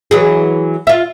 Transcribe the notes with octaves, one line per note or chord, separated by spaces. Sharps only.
E3 F#3 G#4
F4 E5